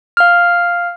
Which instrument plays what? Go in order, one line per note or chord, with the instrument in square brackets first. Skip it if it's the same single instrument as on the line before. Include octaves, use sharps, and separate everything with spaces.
[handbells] F5 F6